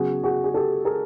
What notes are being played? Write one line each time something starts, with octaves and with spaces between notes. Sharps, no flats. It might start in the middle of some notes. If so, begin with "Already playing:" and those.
Already playing: C#3 F#3 B3 F#4 G#4
F#4 G#4
G#4
G4 A4
G#4 A#4